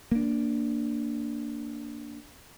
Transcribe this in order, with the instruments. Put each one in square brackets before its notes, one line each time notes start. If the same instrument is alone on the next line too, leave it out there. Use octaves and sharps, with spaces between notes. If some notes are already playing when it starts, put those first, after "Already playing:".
[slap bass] A#3 D4